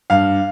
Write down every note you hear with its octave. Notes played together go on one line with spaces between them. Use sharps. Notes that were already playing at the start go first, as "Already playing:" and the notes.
G2 F5